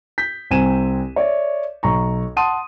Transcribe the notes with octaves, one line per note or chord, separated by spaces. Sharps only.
G6 B6
C2 C4 G#5 D#7 E7
C#5 D5 E5
B1 A#5 C#6
F#5 A5 C6 D#6 D#7